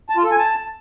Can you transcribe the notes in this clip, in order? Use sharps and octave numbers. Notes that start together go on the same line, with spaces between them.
A5
F4
A4
G#5
A5